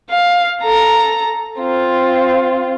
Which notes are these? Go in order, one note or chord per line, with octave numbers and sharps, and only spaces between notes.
F5
A4 A#5
C4 F4